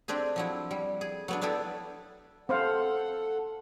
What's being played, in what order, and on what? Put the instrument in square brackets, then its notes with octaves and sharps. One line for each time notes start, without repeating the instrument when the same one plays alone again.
[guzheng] C4 D4 G4 G#4
F3 F#3 E4
G3
G#4
F#3 B3 D4
B3 D4 E4 G4 A4
[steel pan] C4 C5 F5 [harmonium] A4 F#5